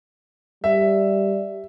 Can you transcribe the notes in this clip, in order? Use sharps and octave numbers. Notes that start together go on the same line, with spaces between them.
G3 E5